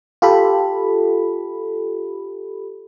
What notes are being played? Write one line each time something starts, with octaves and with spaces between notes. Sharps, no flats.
F4 G4 A4 B5